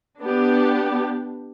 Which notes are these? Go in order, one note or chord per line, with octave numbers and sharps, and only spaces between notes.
B3 D4 G4